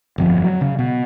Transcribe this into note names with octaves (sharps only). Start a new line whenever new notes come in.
G1 F2 F3
F#3
C#3
B2